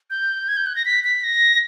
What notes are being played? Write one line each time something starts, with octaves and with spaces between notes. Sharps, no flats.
G6
G#6
G6
F#6
A#6
B6
B6
A#6